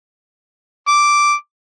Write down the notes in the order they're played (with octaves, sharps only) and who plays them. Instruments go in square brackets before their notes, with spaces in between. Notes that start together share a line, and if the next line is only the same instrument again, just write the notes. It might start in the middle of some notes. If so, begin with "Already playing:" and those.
[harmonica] D6